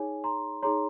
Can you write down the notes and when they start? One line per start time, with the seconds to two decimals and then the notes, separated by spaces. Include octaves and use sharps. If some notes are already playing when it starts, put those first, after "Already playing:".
Already playing: D#4 G#4 C#5 G#5
0.24 A#5 C6
0.63 D#4 G#4 C#5 A#5 C6